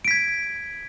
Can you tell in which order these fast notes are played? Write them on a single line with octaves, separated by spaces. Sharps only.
D7 B6 G#6